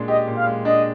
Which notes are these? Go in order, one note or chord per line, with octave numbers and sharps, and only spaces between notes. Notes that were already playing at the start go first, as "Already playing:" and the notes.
Already playing: A#2 G#3 D4
G4 D#5
A#2
F5
G#3
D4 D#5